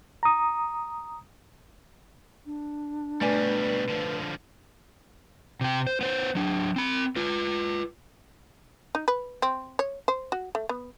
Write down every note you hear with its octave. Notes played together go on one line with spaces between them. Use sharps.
A#5 D#6
D4
B2 G3 A3 B4 D5 G#5
D3 F3
C3 G5
C5
B3 C5
F#3 D4
C4 B5
F4 B4
D#4
B4
C4
C#5
C5
F#4
A3
B3